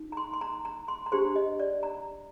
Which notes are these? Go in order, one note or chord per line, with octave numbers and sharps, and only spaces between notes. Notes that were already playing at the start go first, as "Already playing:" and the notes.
Already playing: D#4
A#5
C6
C6
A#5
A#5
C6
A#5
D4 G4 C5 C6
D#5
D5
A#5